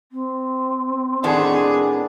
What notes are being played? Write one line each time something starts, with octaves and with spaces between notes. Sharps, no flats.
C4
A2 D#3 B3 D4 G#4